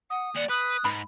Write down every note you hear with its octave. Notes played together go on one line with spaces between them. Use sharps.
F#5 D#6
D#2 D5 F#5
B4 D#6 F#6
G#2 B5